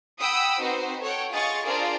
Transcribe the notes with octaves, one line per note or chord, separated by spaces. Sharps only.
F#5 G5 B5 D#6 E6
C4 D#4 F#4 B4 C5
A4 C#5 F#5 G5
F4 G#4 D#5 C#6 A6
D4 F4 G#4 A#4 C5 D5